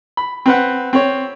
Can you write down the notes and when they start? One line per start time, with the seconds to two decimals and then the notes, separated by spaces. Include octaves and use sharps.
0.17 B5
0.46 C4 B4 F#5
0.93 C4 C#5